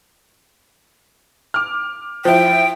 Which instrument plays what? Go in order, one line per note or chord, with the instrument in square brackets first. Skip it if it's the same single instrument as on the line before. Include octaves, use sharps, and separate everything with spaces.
[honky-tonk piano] D6 F6
[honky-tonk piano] F3 E4 [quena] G5